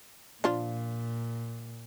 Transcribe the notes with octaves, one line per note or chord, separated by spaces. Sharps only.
A#2 F3 D4 F4